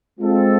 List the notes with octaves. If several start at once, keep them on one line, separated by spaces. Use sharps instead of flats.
G#3 C4 F4 A4